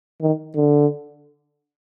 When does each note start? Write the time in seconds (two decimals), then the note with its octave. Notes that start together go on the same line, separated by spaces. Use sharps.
0.21 D#3
0.56 D3